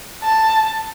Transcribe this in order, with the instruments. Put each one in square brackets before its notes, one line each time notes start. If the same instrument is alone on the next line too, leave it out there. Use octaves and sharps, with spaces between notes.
[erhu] A5